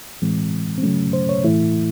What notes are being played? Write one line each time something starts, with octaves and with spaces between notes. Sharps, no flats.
A2 E3 G#3 C4
C4
C#3 F#3 A3 C#4
C5
C#5
A2 E3 A3 E4